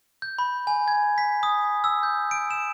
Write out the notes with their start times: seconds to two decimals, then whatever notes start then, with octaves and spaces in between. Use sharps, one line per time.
0.22 G6
0.39 B5
0.67 G#5
0.88 G#6
1.18 B6
1.43 D#6
1.84 E6
2.03 G6
2.31 D7
2.51 E7